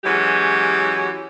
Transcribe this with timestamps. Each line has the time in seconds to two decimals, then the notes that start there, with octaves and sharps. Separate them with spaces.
0.04 E3 F#3 G#3 C#4 F#4 G4